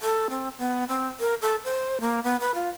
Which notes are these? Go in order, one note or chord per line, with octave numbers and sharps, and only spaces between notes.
A4
C4
B3
C4
A#4
A4
C5
A#3
B3
B4
F4